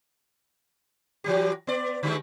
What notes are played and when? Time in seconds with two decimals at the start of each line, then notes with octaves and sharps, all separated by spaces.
1.24 E3 F#3 G4
1.67 B3 D5
2.03 D3 G3 G#3